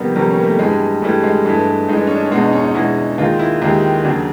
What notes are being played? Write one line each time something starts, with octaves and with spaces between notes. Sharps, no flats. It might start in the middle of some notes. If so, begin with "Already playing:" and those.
Already playing: F2 C3 D#3 G3 A#3 B3
F2 C3 D#3 G3 C#4
C#4
A#3
A3
G2 E3 G3 G#3
G2 E3 G3 A3
G#3
G2 E3 G#3 A3
G2 E3 G#3 D#4
D4
C#4
D4
C#4
E2 B2 G#3 D4
D#4
C#4
D#4
E2 B2 G#3 E4
D#2 D#3 G#3 F4
E4
D#2 D#3 G#3 G4
D#2 C#3 F#3 D4